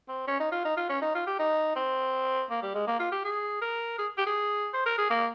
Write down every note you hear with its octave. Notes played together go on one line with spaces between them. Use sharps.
C4
C#4
D#4
F4
D#4
F4
C#4
D#4
F4
G4
D#4
C4
A#3
G3
G#3
A#3
F4
G4
G#4
A#4
G#4
G4
G#4
C5
A#4
G#4
A#3